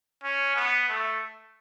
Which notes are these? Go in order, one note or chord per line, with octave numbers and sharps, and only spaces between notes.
C#4
B3
A3